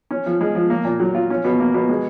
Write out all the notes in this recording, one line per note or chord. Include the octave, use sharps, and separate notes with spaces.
C#4
F3
G#3
F3
A#3
A#2
F#3
F4
C#4
B2
A#3
B2
G#3